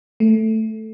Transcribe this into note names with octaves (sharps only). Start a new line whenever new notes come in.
A3